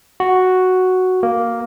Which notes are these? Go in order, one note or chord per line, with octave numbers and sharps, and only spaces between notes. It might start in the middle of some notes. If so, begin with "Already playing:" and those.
F#4
A#3